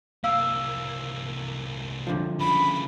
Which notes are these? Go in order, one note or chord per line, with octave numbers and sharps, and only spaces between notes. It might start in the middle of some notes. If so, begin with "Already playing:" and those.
C2 A#3 F5 E6
D3 F3
C#3 E4 B5